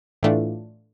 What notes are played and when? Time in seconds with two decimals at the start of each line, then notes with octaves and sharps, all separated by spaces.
0.23 A2 E3 A3 D4 F4